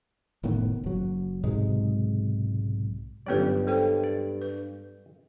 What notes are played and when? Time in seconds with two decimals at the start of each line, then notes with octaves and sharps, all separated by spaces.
0.43 F1 A2 D#3 B3
0.84 F#1 F#3
1.43 B1 G#2 C3 G#3
3.26 G1 G2 F#3 B3 C#4 B4 D5
3.67 A4 C5 G5
4.04 D5
4.41 B4